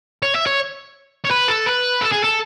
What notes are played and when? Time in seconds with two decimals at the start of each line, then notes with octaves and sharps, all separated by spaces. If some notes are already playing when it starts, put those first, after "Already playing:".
0.23 C#5
0.35 E5
0.46 C#5
1.24 C#5
1.30 B4
1.48 A4
1.66 B4
2.02 A4
2.12 G#4
2.24 A4